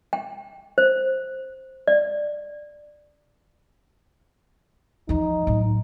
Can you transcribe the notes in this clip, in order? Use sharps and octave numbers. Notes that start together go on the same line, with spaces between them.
G5
C5
D5
E2 F3 D#4
A2 F#3